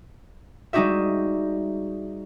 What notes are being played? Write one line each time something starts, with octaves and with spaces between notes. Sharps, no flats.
G3 G#3 D#4 F#4 G4 E5